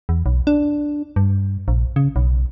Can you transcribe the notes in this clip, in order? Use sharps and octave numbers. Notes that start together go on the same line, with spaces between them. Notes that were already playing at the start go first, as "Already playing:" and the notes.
E2
B1
D4
G2
A#1
C#3
B1